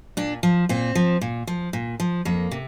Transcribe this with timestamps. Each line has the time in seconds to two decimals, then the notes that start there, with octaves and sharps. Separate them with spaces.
0.17 A#2 D4
0.43 F3
0.69 A#2 C4
0.95 F3
1.21 A#2
1.47 F3
1.73 A#2
2.00 F3
2.25 F2 A#3
2.51 C3